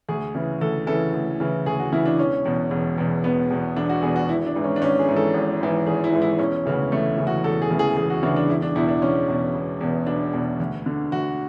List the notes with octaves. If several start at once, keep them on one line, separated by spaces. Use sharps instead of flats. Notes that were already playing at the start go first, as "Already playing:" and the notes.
D2 G#4
C#3 E3
D2 A4
C#3 E3 A4
D2
C#3 E3
D2 G#4
F#4
C#3 E3 E4
D4
E1 C#4
E2 B2
E1
E2 B2
E1 B3
E2 B2
E1 D4
F#4
E2 B2 G#4
F#4
G#1 E4
D4
G#2 E3
C#4
D4
G#1 C#4
G#4
G#2 E3
A4
G#1
G#2 E3
G#1 G#4
E4
G#2 E3
E4
E1 C#4
D2 C#3 E3
E1 A3
D2 C#3 E3
F#4
E1 A4
G#4
D2 C#3 E3
G#4
E1 G#4
F#4
D2 C#3 E3 D4
D4
E1 E4
D4
E2 B2 E4
D4
E1 C#4
E2 B2
E1
E2 B2
E1 D4
E2 B2
D2
D3
D2 F#4